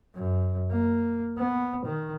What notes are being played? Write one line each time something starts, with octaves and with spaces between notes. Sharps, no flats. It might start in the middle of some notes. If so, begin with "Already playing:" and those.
F#2
A#3
B3
D#3